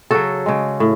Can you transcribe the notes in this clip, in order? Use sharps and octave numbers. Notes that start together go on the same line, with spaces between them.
C#3 F#3 F#4 A4
C#3 G#3
A2